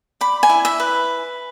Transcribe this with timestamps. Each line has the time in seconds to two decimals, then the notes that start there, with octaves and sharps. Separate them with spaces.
0.21 D5 B5
0.43 G#5
0.49 E4
0.65 E5
0.80 B4